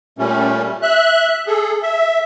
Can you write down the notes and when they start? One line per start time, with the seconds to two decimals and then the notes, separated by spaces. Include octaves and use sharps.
0.18 A#2 G3 A3 C#4
0.82 E5 F#6
1.47 G#4 A4
1.82 E5